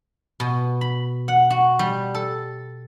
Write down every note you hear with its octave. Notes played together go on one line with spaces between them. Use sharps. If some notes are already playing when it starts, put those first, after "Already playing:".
B2
B5
F#5
F#4
G3
A4